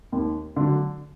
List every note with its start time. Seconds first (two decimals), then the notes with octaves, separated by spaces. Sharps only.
0.12 D#2
0.56 D3 F#3